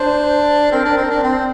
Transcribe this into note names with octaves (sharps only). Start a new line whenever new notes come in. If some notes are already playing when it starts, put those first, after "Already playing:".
Already playing: D4 C5
C4 A#4
D4
C4
D4
C4